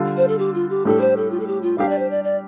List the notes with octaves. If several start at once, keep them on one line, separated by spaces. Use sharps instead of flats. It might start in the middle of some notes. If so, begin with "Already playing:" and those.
Already playing: D3 G3 F4 A4
C5
A4
G4
F4
G4
A2 G3 D4 G4 A4
C5
A4
F4
A4
G4
F4
G3 D4 G4 F5
D5
C5
D5
D5